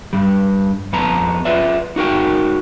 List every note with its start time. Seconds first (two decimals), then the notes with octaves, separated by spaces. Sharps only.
0.13 G2 G3
0.93 F2 B3 A5 A#5
1.45 F4 B4 D5 E5
1.96 D#4 F#4 A#4 G5